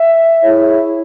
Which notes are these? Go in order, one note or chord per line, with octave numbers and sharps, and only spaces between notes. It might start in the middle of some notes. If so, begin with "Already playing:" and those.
Already playing: E5
E4 G#4 C#5